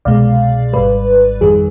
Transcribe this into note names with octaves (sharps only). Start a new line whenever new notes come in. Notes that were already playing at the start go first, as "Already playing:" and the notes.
C2 B2 G#3 D5 F5
G#1 G#2 G3 B4 D5
F2 D#3 G3 G#4